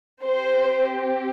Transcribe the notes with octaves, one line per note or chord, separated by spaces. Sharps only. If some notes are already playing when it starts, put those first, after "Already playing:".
C4 G4 C5